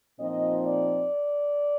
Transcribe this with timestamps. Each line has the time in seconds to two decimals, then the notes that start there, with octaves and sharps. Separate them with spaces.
0.20 A#2 F3 C4 D#4 D#5
0.64 D5